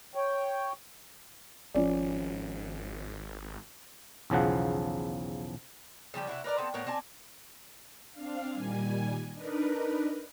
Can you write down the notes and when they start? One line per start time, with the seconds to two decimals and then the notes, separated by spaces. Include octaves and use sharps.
0.15 C#5 G5
1.75 G#1 F3 C#4 D5
4.30 B1 E2 C#3 F3 F#5
6.14 C#3 F3 G3 G4
6.27 C3 E4 F#4
6.44 A#4 B4 D5 A#5
6.58 B3 C4 A4
6.74 A2 B3 A#4 C#5
6.87 C4 D5 G#5 A5
8.13 C4 D4 F5
8.52 A#2 D#3 G3 G#5
9.33 D4 D#4 A#4 B4